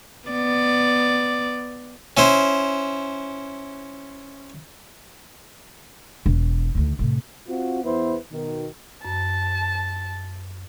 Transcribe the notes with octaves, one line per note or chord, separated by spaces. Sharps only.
B3 D5
C#4 E4 C5
E1
D2 D#3
A2 C3
C4 F4 F#4
E2 B3 E4 B4 C5
B2 D#3
F#2 A5